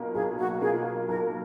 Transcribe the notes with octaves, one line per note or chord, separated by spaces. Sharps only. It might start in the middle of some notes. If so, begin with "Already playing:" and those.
Already playing: B1 B2 A#3 F4
B1 G#4
F#4
B2 A#3 F4 G#4
B1 A#4